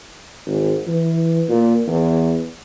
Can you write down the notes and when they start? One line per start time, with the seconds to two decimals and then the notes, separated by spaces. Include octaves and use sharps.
0.46 G#1
0.88 E3
1.49 A#2
1.88 E2